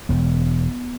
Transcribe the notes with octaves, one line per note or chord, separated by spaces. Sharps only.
E1 B3